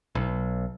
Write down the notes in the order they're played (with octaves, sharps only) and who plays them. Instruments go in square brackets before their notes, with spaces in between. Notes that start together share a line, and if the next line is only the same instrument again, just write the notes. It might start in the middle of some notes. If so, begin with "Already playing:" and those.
[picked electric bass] B1